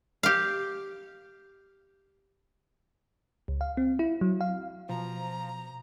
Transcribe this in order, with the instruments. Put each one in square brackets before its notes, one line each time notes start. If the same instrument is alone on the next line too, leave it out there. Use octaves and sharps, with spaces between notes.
[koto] G4 F5
[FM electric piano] C#2
F5
C4
E4
F#3
F5
[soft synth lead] B2 [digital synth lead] F3 [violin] A#5